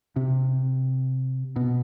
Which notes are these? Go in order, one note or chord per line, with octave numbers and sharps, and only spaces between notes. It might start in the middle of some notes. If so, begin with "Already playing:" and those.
C3
B2